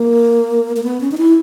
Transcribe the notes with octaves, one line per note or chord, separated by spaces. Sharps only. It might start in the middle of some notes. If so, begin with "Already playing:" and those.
Already playing: A#3
A#3
B3
C#4
D#4
E4